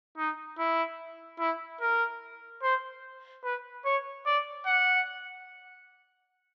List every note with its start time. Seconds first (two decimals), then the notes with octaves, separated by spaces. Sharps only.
0.18 D#4
0.59 E4
1.40 E4
1.81 A#4
2.63 C5
3.44 B4
3.85 C#5
4.26 D5
4.66 F#5